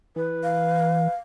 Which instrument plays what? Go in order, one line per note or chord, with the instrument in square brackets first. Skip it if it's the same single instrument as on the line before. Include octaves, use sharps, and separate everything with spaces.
[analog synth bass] E3 [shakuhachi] B4
[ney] F5